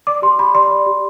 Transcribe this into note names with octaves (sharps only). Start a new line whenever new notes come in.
D5 D6
G4 C6
G4 B5
D5 C6
D5
G4